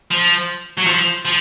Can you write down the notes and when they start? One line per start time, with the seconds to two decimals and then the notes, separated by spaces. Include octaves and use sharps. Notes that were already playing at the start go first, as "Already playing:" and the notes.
0.11 F3
0.77 F#3
0.87 F3
1.25 F3